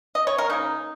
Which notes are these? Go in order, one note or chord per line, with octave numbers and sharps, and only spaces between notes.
D#5
C#5
A#4
C#3 A#3 D#4